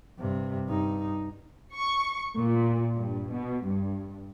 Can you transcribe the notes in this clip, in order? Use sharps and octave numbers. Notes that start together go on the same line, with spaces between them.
G2 C3
G2 D#4
C#6
A#2
G2
B2
G2